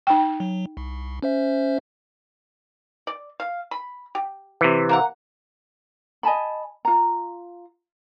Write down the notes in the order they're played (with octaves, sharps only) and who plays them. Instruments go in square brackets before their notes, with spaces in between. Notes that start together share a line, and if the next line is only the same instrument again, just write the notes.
[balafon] D#4 G5
[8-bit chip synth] F#3
C2
C#4 C5 E5
[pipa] D5
F5
B5
G4
[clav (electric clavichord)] C3 E3
[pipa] A#3 A#4 F#5
[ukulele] D#5 G#5 A5 B5
F4 A#5